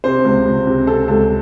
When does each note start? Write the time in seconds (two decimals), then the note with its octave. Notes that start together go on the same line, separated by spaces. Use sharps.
0.04 C3 C5
0.25 C#2
0.45 C#2
0.67 C3
0.87 C3 A4
1.08 C#2 A4